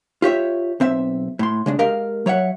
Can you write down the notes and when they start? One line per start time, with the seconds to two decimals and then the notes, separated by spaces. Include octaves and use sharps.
0.22 F4 G4 C#5 E5
0.80 B1 C4 E5
1.39 A2 C6
1.66 C#3 G#3 D4
1.79 G#3 G4 A#4 D#5 F5
2.26 F#3 C#5 E5 F#5